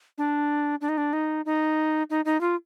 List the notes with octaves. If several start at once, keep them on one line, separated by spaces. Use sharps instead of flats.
D4
D4
D#4
D4
D#4
D#4
D#4
D#4
F4